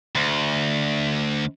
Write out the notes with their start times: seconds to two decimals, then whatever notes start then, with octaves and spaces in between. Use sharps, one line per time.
0.15 D2